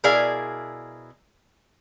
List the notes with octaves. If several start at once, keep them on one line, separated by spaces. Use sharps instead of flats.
B2 E4 G#4 A#4 D5 F5